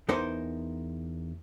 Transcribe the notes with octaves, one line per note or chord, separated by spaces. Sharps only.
E2 B3 D#4 A#4 C5